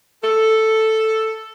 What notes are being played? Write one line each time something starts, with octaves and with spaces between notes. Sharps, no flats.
A4